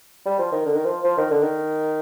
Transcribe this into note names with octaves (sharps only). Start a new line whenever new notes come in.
G3
F3
D#3
D3
D#3
F3
F3
D#3
D3
D#3